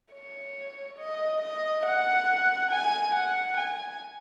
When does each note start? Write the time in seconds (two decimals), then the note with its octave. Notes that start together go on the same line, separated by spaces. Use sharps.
0.14 C#5
0.99 D#5
1.42 D#5
1.86 F#5
2.71 G#5
3.15 F#5
3.57 G#5